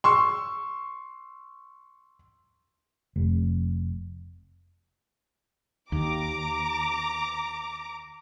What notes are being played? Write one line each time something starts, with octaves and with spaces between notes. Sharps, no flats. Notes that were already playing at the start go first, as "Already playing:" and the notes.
C6 C#6 E6
F1
D#2 A#5 D6